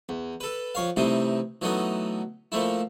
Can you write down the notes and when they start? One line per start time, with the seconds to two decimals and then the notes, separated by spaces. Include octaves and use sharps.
0.09 E2
0.40 A4 B4
0.75 F2 C#5 F5
0.96 A2 C3 E3 G3 D#4
1.62 E3 F#3 A3 B3 D#4
2.52 A#2 F3 A3 E4